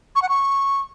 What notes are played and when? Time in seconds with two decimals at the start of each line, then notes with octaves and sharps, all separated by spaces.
0.16 C#6
0.22 F#5
0.29 C#6